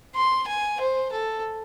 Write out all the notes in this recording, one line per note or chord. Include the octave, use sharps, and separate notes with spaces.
C6
G#5
C5
A4